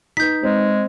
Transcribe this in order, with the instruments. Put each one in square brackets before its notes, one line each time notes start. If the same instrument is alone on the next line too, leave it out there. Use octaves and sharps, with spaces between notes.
[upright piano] D#4 B4 [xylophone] G6 B6
[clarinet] G#3 [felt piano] C4